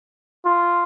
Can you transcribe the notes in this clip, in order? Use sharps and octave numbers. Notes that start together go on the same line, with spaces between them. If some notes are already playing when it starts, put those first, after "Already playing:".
F4